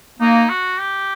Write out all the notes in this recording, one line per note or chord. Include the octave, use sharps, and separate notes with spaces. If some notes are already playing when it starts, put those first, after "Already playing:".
A#3 D#4
F#4
G4